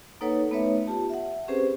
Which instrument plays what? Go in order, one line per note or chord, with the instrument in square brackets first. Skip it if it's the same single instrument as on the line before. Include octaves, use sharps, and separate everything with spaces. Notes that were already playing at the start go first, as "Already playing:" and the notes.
[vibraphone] A#3 D#4 A4 B4 C#5 F#5
A3 B3 D#4 B4 C#5 E5
F4 G4 A5
E5 F#5
C4 C#4 G4 G#4 B4 C5